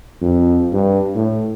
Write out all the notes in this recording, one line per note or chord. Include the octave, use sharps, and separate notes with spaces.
F2
G2
A2